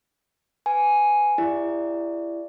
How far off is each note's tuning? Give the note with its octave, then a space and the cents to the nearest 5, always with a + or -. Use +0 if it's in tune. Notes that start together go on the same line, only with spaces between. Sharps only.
B4 +25 G#5 +0
E4 +25 G4 +40 D5 +0